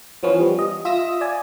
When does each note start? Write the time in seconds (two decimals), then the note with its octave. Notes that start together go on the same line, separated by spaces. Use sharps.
0.23 E3 F3 B3 C#4
0.40 G3
0.59 D#5
0.85 F4 E5 D#6 E6 A#6
1.21 D5 G#5